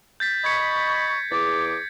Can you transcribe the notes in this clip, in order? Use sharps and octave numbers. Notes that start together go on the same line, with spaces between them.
G6 A6 B6
D#5 B5 C#6 G#6 C#7
E2 G#4 D6 A6